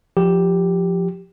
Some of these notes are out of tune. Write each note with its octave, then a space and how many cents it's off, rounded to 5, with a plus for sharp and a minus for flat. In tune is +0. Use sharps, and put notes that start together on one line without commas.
F3 +5 G4 +0